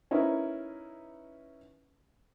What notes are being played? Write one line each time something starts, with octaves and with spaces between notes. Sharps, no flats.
C#4 D#4 E4 A#4 B4